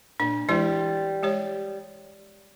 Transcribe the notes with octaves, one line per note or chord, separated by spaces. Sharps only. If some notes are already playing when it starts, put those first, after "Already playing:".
A#2 D4
E3 G3 G#3 E4
G#3 G4 C#5